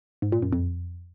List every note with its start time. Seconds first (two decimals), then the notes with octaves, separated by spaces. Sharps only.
0.22 G#2
0.32 A#2
0.42 F#2
0.52 F2